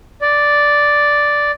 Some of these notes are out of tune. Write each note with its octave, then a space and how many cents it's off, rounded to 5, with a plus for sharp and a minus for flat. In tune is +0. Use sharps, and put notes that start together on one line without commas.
D5 -5